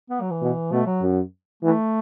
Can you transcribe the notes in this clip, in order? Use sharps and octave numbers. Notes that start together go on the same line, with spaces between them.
B3
F#3
E3
B2
B2 A3
F#3
F#2
E3 A3